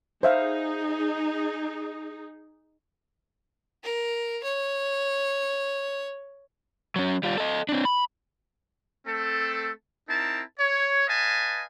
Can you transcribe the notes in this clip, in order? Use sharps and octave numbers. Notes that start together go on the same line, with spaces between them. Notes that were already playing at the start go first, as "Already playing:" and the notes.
D#4 G#4 C5 E5 F5
A#4
C#5
F#3 C#4
G3 F4
A4 D#5
C4 D4
B5
A3 C4 A4
C4 D#4 E4 A#4 A5
C#5
B4 D#5 F5 G#5 A5